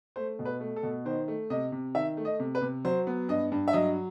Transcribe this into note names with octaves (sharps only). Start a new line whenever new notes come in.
A3 C5
B2
B4
A3
A4
B2
D#3 C5
A3
C3 D#5
C3
D#3 E5
A3
D#5
C3
B4
C3
F#3 C5
B3
G2 D#5
G2
E5
F#3 D#5